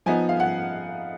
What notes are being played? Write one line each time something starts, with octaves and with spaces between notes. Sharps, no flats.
F3 B3 D#4 G#5
F5
F#5